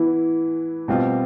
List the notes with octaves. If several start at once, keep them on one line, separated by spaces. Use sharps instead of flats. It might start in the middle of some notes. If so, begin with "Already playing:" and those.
Already playing: E3 B3 E4
B2 G3 C4 F4